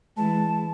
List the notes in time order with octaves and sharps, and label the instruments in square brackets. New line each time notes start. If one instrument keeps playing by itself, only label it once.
[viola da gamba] E3 G#3 [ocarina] A5